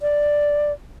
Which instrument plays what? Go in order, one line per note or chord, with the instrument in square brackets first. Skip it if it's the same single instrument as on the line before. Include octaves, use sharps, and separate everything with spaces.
[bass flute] D5